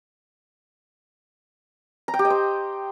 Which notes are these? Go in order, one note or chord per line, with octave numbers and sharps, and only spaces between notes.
A#5
G5
G4
D#5
C5